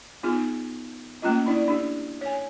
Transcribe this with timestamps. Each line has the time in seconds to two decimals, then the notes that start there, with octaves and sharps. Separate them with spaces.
0.23 B3 D#4 F4 G#4
1.22 A3 A#3 C#4 F4 D#5
1.46 D4 E4 D5
1.68 D4 G4
2.21 C#5 G#5